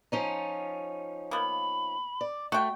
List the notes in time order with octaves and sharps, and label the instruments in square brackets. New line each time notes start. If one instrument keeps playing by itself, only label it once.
[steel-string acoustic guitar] F3 C#4 D#4
[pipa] A#3 B3 [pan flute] B5
[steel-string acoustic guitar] D5
[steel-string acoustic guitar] A3 [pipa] F#4 G5